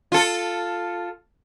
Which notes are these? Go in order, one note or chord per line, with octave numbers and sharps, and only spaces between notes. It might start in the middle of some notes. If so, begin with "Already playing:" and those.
F4 A4